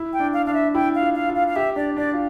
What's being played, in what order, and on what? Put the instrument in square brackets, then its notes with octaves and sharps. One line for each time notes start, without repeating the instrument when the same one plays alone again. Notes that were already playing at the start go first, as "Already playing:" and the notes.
Already playing: [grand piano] E4
[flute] G5
[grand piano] D4
[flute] F5
[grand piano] D4 [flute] F5
[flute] E5
[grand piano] E4 [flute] G5
[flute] F5
[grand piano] F4
[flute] F5
[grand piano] F4
[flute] F5
F5
[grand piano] G4 [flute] E5
[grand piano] D4 [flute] D5
[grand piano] D4 [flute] D5
[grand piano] F4